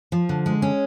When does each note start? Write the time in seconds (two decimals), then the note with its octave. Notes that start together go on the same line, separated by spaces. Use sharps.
0.12 F3
0.29 D3
0.46 G#3
0.62 C#4